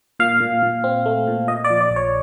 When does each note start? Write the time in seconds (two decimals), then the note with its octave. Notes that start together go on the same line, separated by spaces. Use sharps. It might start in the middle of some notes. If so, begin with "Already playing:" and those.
0.19 A#2 F5
0.40 A#2
0.62 A#2
0.84 C4
1.06 A3
1.27 A#2
1.48 A#2 D#5
1.65 D5
1.70 F3
1.81 D5
1.90 A#1
1.96 C#5